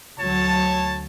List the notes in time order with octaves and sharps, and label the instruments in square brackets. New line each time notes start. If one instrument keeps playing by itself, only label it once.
[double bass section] D2 F#3 [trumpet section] C#5 A5